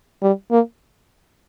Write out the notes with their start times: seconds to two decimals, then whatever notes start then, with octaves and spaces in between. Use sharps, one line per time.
0.22 G3
0.51 A#3